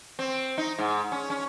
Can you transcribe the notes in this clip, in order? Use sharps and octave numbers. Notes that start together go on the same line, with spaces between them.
C4
D#4
G#2
C#4
C#4